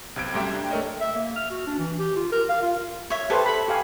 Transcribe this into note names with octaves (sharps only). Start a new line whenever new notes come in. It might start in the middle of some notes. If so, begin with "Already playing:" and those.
B1 C3 G#6 D7
F#2 G3 A3 G4 E5 G5
D4 G5
A3 A4 A#4 C#5 D#5
E5
A#3
F6
F#4
D4
E3
G4
F4
A#4
F5
F4
C#5 E5
G4 A4 B4 C5
B5
G4 F5 G#5